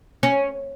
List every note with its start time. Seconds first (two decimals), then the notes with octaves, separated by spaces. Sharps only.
0.23 C#4